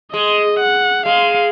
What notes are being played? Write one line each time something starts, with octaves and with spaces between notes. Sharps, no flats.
G#3 D#5
F#5
G#3 F5